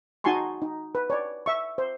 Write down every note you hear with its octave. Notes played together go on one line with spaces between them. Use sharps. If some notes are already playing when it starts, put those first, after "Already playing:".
D#4 F#4 G#5 A5 C6 C#6
D#4
B4
C#5 D5
E5 C#6
C5